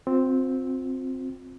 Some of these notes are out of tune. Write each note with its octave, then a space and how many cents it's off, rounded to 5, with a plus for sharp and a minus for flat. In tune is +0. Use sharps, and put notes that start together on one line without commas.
C4 +0 F4 +40